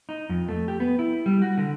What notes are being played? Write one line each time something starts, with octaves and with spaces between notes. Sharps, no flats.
D#4
F2
A3
G4
B3
E4
G3
F#4
D3